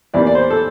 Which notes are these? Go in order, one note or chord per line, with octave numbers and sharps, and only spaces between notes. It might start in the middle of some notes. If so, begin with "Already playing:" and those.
E2 E3 G3 A#3 D5
D5
C5
A4